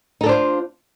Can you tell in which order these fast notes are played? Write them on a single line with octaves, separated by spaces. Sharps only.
D#4 A4 D4 C5 F4